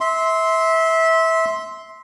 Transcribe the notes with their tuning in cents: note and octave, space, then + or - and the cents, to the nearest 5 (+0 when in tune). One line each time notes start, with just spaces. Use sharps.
E5 -20 C6 +0